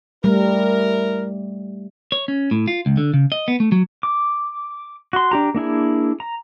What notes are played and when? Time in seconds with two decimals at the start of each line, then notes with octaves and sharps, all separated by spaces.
0.24 G3 A3 E4 A#4
2.12 C#5
2.28 C#4
2.51 A2
2.68 F4
2.86 C#2
2.97 D3
3.14 C#3
3.32 D#5
3.48 B3
3.60 A3
3.72 F#3
4.03 D6
5.13 F#4 C6
5.31 D4 G4 A#5
5.55 A#3 D4 E4 G#4
6.20 A#5